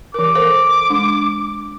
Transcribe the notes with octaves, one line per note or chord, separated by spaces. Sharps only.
E3 A#4 D6
A4 A#4 C5
G#3 D4